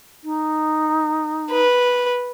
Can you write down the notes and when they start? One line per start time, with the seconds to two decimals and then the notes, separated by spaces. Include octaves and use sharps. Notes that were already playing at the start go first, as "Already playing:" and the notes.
0.24 D#4
1.50 B4